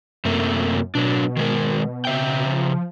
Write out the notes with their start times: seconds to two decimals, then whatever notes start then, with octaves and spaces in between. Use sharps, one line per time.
0.25 F#2 C3 A3 A#3
0.95 B2 F#3 D4
1.37 D#3 G#3 A#4
2.05 C#3 E5 G5
2.46 F3